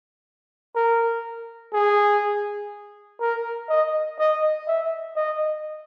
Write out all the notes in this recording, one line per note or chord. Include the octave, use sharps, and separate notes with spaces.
A#4
G#4
A#4
D#5
D#5
E5
D#5